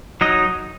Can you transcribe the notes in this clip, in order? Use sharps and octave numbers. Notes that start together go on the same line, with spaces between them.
F#3 D#4 D#5